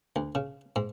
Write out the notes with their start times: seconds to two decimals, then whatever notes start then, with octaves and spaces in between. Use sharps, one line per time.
0.16 D2
0.35 C#3
0.76 G#2